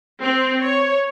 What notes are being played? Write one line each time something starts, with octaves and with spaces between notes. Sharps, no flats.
C4
C#5